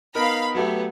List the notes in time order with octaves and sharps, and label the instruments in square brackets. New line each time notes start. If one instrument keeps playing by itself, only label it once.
[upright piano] B3 D#4 A#4 [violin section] F5 B5
[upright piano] F#3 A3 G4 [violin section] B3